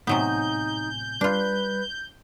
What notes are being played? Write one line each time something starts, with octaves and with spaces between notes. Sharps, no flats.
A2 C3 F#3 B3 D#4 G#5 G6
G3 D4 F4 B4